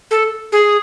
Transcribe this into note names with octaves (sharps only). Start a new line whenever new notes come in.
A4
G#4